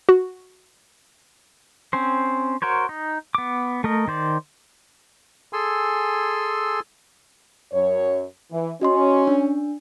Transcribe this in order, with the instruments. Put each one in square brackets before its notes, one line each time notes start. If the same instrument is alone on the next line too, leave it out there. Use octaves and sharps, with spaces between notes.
[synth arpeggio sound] F#4
[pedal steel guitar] C4 C#4 C5
F#4 A#4 C5 C#5
D#4
B3 D6
A3 A#4 D#5
D#3 C5 D5
[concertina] G#4 A4 G#5 C6 E6
[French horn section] F#2 C#5
E3
[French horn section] C#4 [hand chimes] F#4 D#5 C6
[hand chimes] D4